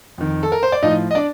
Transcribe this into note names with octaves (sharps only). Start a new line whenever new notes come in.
F2 D#3
A4
A#4
C5
D5
A2 F3 D#4 D#5
D#5
D4 D5